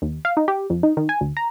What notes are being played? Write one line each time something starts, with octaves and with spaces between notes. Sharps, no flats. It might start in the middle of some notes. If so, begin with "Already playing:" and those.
D#2
F5
D#4
G4
F2
D#4
D#3
G#5
D2
A#5